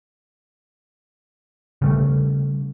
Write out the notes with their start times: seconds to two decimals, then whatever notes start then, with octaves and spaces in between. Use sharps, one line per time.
1.82 C#3 G3 A3